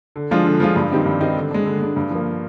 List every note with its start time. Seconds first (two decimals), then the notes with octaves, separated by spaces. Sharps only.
0.16 D3
0.31 F3 G#3 D4 F4
0.46 D3
0.60 F3 G#3 D4 F4
0.76 G2
0.91 D#3 G3 C4 D#4
1.06 G2
1.21 D#3 G3 C4 D#4
1.37 D3
1.51 G#3 D4
1.66 D3
1.81 G#3 D4
1.96 G2
2.11 F3 A#3